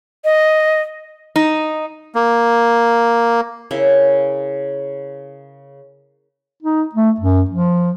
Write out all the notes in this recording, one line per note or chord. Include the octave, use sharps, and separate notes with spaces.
D#5
D#4
A#3
C#3 A#3 E4
D#4
A3
F#2
F3